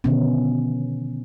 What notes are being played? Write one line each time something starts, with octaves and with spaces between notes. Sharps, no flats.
B2 D3 D#3 F3 B3 C#4